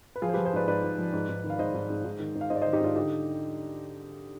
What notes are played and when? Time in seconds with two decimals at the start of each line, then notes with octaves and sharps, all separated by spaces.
0.16 B4
0.22 F3 F4 G#4
0.29 C5
0.34 F3 G4 B4
0.45 G#4 C5
0.53 G#2 B4 D5
0.68 G#2 B4 D5
0.83 G#2
0.98 F3
1.13 G#2
1.29 G#2
1.44 D#3
1.50 F5
1.59 G#2 C5 D#5
1.74 G#2
1.90 G#2
2.05 G#2
2.20 D#3
2.35 G#2
2.41 F5
2.50 G#2 C5 D#5
2.56 D5
2.61 D#3 C5 D#5
2.73 D#4 G4
2.80 G#2 D4 F4
2.96 D3 D#4 G4